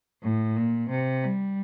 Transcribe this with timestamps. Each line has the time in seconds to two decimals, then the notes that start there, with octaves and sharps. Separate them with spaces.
0.22 A2
0.56 A#2
0.90 C3
1.24 G3